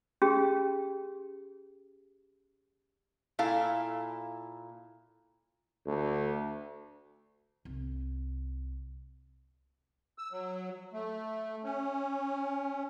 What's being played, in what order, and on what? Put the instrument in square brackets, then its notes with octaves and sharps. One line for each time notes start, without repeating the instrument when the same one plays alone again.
[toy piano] C#4 G4 G#4
[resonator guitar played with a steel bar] A#2 E4 A4 F5
[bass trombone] D2
[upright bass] C2
[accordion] E6
F#3
A3
C#4